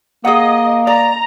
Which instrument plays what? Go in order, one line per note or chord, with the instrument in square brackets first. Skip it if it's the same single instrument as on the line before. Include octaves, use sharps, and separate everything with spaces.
[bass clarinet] A#3 [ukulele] G#4 F#5 [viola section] D#5
[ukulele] D5 [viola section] A#5